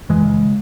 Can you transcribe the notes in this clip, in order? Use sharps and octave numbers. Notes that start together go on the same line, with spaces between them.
F#2 E3 G#3
C#3